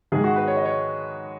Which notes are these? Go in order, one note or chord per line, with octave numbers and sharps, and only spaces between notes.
G#2 D#3 G#3 G#4
F#4
B4
C#5
D#5
C#5